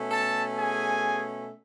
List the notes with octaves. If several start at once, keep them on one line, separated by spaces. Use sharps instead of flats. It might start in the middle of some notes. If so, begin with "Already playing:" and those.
Already playing: B2 A3 C#4
A4 A5
G#4 G#5